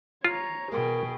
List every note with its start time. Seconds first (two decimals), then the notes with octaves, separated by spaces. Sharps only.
0.25 F4 C#5 A#5
0.72 B2 G#4 A#4 G5